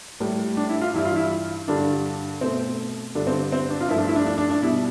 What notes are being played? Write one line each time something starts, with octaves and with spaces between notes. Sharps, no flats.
A2 G3
D4
E4
F4
G2 E3 G3 E4
F4
E4
G2 D3 G3 D4
B2 A3 C4
G2 D3 G3 D4
C4
D4
C4
D4
F4
G2 F3 A3 E4
D4
E4
D4
D4
D4
D4
B2 G3 E4